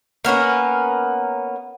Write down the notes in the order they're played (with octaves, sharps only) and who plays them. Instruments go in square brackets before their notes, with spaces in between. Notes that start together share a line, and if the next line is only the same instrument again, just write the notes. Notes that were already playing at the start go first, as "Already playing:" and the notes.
[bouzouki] A#3 B3 C#4 A#4